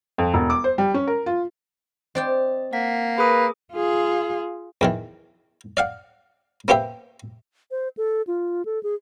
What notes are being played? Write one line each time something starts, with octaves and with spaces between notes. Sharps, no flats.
F2
E1
D6
C5
G3
C#4
A#4
F4
C4 D5 D#5 G5
A#3 F#5 B6
G#4 A#4 B4 D#6
F4 G#4
E2 D#3 E3
D5 F5 F#5
A#3 B3 G4 C5 E5
C5
A4
F4
A4
G#4